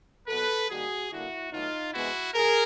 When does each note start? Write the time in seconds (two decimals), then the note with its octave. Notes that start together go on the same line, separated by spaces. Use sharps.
0.28 B2 F#3 B3 A4 B4
0.69 D#3 G3 A#3 F#4 G#4
1.11 D3 G3 A#3 E4 F#4
1.52 B2 F#3 A3 D#4 F4
1.93 C3 E3 G#3 B3 E4 F#4
2.34 C#3 G#4 A#4